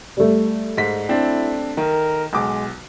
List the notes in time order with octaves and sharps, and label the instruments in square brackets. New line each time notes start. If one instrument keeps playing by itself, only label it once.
[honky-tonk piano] G3 A3
[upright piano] G#2 B6
[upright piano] C4 D4 [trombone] E4
[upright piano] D#3 [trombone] A#4
[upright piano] B1 D6 [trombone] G#3